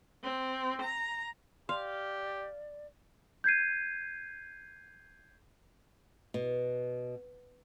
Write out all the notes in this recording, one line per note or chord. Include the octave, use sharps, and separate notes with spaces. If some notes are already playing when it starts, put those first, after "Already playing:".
C4
A#5
G4 D5 F5 C6
G6 G#6 C7 D#7
B2